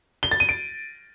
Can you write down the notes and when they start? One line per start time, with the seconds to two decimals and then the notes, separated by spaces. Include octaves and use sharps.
0.23 G7
0.31 A6
0.40 D#7
0.49 D7